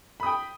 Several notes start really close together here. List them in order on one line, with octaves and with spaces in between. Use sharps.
B5 D#6 G5